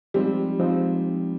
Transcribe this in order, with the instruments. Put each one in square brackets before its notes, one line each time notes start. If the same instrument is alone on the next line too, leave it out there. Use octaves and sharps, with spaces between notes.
[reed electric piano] F3 G#3 C4 D#4 [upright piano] G3
[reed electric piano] F3 G#3 C4 D#4